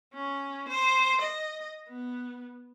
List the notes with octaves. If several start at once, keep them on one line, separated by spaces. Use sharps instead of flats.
C#4
C5
D#5
B3